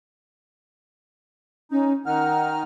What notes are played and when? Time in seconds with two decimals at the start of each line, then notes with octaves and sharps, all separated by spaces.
1.71 C#4 D#4
2.06 D#3 D#4 F#5 F6